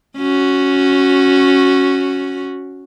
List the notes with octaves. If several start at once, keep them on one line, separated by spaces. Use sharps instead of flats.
C#4 F#4